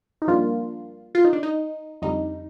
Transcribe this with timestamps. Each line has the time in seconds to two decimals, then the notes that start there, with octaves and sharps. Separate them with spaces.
0.22 D#4
0.28 G2 F3 A#3 D4 F4
1.15 F4
1.25 D#4
1.33 D4
1.43 D#4
2.02 F2 D3 G3 D#4